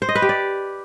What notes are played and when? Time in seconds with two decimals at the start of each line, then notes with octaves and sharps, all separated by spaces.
0.02 C5
0.09 D#5
0.15 B4
0.22 G4
0.29 D5